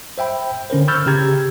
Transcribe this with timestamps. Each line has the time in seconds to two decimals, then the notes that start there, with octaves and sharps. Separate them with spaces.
0.18 C5 E5 G5 B5
0.70 D3 C#4 A#4 C5
0.88 B5 C#6 E6 F6 G6 A6
1.06 C#3 G4 A#5 G#6